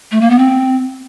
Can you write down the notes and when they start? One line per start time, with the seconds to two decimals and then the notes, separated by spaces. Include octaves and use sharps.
0.11 A3
0.21 A#3
0.30 B3
0.38 C4